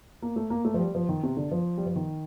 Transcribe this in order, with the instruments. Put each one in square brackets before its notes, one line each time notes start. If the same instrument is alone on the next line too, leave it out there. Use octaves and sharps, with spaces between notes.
[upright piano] A#3
A3
A#3
A3
F3
G3
F3
D#3
C3
D3
F3
G3
F3
D#3